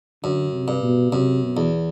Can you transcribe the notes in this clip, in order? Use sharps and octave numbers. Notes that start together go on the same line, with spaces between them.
F#2 D3
C3
G2
B2
F#2 C3
B2
E2